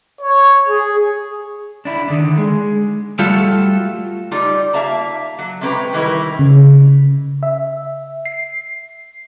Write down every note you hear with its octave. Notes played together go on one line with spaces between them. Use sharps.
C#5
G#4
D4 E4
D3 D#3 D4
G#3
G3 A3 F4 F#4 A4
G3 D#4 F4
A#3 E5 F5 A5 A#5
F#3
C3 G#3 C#4 B4 G5 A#5
D#3 E3 G3 E4 A#4 B4
C#3
E5
C7